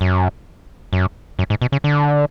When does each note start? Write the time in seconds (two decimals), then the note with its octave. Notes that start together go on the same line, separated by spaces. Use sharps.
0.01 F#2
0.93 F#2
1.39 F#2
1.50 G#2
1.62 B2
1.72 C#3
1.84 D3